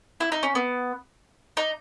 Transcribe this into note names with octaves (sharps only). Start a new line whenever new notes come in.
E4
D#4
C#4
B3
D#4